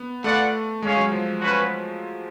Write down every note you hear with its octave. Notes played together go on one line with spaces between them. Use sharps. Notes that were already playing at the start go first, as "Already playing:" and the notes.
Already playing: B3
A3 F4 B4 D5 F#5
G#3 C#4 G#4 C#5 F5
F#3
F3
C#4 F#4 B4